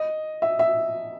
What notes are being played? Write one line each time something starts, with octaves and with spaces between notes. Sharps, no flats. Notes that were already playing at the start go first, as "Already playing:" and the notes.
Already playing: D#5
E5
E5